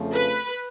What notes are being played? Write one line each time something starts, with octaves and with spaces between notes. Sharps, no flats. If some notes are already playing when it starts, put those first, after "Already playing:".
Already playing: F2 C#3 F3 A3 C4
B4